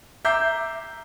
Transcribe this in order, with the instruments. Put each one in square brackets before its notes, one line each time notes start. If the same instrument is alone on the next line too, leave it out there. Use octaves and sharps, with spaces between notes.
[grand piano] E5 A#5 D6 G6 C7